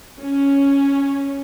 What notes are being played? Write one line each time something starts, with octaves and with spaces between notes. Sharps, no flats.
C#4